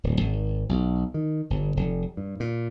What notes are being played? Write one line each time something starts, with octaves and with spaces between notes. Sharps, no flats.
D1
G#1
B1
D#3
G1
F1
G2
A#2